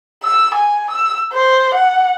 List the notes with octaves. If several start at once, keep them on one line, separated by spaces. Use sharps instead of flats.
E6
G#5
E6
C5
F#5